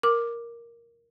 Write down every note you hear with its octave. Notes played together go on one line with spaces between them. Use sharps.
A#4 D6